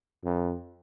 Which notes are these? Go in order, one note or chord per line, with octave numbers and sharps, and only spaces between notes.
F2